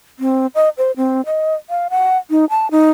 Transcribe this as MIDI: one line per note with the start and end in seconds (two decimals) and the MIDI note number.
0.19 0.47 60
0.55 0.69 75
0.78 0.92 72
0.97 1.21 60
1.26 1.54 75
1.70 1.88 77
1.90 2.18 78
2.30 2.45 63
2.50 2.70 81
2.71 2.91 63